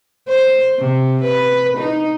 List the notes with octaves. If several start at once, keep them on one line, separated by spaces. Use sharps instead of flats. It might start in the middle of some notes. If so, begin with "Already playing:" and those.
C5
C3
B4
D#4